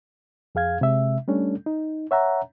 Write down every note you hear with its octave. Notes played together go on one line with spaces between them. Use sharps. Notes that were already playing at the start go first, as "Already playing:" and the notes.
F2 G#4 F5 G#6
C3 G#3 E5
G3 A3 C#4 D4 A4
D#4
C#5 E5 F#5 A#5